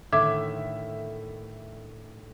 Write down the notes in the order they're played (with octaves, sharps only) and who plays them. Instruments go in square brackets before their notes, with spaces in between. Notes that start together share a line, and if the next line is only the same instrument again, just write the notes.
[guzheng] A2 D3 D#3 [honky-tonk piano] E5 [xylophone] D6 G#6